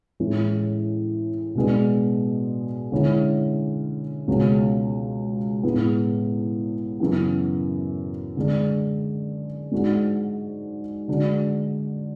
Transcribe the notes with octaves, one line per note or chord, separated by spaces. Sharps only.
A2 E3 G#3 C#4
B2 G#3 B3 D4
D3 G#3 C#4 E4
C#2 B2 G#3 C#4 F#4
A2 G#3 B3
F#2 C#3 E3 B3
D3 G#3 D4
G#2 G#3 D4 F#4
D3 G#3 D4 F#4